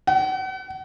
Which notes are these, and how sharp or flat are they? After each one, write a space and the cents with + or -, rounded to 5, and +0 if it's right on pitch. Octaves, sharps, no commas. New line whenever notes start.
F#5 +40